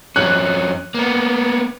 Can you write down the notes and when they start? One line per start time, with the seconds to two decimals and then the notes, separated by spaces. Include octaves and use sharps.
0.16 F2 C#4 F#6
0.94 A#3 B3